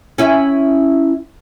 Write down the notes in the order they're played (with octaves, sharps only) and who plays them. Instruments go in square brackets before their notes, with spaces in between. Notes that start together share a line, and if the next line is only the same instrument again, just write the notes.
[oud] C#4 E4 E5